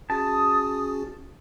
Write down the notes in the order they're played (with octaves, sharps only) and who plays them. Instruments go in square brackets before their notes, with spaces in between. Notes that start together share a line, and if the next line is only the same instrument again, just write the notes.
[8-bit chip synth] C#4 F#4 G#4 [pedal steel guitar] A5 [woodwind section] D#6